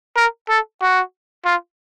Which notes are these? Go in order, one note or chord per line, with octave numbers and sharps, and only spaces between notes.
A#4
A4
F#4
F4